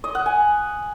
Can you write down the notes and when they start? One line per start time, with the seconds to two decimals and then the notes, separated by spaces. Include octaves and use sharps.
0.04 D#5
0.15 F#5
0.26 G#5